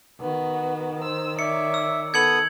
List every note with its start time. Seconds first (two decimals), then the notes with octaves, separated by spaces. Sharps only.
0.20 D#3 B3 F#4
1.02 C5 E6
1.39 C#5 D5 E5 C#7
1.74 E6
2.14 B3 A4 D#6 G#6 C#7 F#7